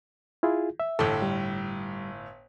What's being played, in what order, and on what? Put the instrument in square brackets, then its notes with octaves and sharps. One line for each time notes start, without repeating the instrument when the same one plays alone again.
[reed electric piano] E4 F4 G#4
E5
[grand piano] G1 A2 [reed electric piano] A4
[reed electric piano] G3